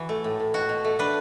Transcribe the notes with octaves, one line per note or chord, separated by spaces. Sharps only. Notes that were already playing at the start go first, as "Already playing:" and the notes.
Already playing: E3 F#4
A3
A2
A2
B2 F#4
B2
A3
D4 B4